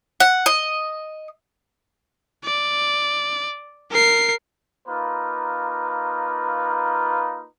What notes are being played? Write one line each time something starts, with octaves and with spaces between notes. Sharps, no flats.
F#5
D#5
D5
A#4 C7
A#3 D#4 F4 B4